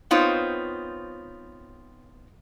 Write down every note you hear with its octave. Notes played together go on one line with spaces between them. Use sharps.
B3 C4 D#4 F4 C5 C#5